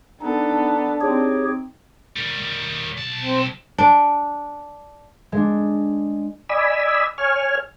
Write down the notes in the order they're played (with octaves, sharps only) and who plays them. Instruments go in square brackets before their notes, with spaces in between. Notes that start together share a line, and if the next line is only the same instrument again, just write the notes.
[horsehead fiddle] B3 A4 [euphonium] D4 [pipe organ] D#4
[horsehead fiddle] C4 D#4 [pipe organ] G4 G#4 C#5
[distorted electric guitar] D#3 G3
B1 A5
[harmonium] C4
[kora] D4
[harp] G#3 D4
[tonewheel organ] D5 D#5 G#5 B5 E6
C#5 G#5 F6